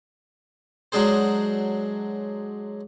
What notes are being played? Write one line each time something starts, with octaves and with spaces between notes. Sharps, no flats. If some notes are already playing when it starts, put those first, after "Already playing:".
F#3 G#3 D4 G#4 C5